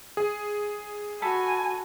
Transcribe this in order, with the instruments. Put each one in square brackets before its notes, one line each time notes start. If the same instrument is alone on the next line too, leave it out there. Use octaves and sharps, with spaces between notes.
[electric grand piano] G#4
[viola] F#4 [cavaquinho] A4 A5 B5 [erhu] G#5